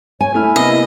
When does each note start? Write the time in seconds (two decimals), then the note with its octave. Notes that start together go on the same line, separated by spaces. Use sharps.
0.21 C#5 G#5
0.34 A3 E4 F6
0.56 C3 A#3 B3 D#5